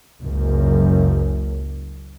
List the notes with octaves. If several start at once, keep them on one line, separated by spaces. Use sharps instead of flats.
F#1 C#2 F#2